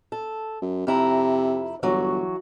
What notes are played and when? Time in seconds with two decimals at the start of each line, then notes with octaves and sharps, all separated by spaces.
0.12 A4
0.62 F#2
0.87 F2 C3 E4 A#5
1.83 G1 E3 F#3 F#4